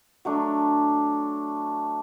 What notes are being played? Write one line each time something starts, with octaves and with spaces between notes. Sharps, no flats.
F#3 A3 D4